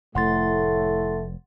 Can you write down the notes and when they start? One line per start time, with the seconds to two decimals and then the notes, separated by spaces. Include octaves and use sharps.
0.15 F1 A2 A3 F#5 C6 A6